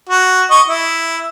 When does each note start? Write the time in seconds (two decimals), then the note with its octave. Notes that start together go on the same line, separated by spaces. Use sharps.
0.09 F#4
0.51 D#5 C#6
0.68 E4